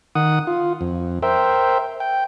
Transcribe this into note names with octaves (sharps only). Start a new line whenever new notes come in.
D#3 F#5 D#6
F4
F2
A#4 C5 E5 G5
G5